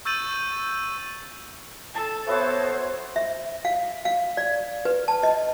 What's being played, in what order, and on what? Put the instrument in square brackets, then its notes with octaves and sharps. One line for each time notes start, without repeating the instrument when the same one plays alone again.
[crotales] C#6 E6 G6 A6 D#7 F#7
[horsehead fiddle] A4 [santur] A5
[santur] A3 B3 F#4 [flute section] C5 C#5
[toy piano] E5
F5
F5
D5
B4
A5
D#5